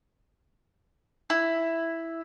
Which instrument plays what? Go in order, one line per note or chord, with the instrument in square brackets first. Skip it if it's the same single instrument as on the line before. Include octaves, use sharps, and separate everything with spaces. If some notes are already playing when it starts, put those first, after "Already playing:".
[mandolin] E4